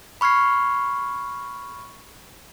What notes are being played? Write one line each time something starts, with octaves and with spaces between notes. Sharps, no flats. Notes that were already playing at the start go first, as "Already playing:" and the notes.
B5 C#6 F6 G#6 C7